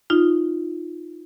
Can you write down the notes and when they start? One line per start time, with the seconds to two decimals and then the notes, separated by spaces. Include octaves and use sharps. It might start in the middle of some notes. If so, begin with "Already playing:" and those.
0.10 D#4 F4